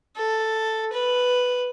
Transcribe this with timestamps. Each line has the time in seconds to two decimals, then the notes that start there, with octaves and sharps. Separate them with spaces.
0.16 A4
0.92 B4